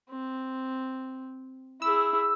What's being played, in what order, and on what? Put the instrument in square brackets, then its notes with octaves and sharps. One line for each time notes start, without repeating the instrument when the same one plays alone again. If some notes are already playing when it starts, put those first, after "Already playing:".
[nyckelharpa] C4
[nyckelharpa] E4 G#4 [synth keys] E6